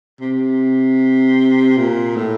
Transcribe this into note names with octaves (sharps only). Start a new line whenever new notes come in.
C3
A#2
A2